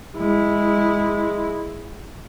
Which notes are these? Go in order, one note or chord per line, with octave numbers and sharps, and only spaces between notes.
G#3 E4